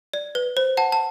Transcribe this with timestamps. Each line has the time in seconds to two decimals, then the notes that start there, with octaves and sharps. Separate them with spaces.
0.14 D5
0.35 B4
0.57 C5
0.77 F#5 A5
0.92 A5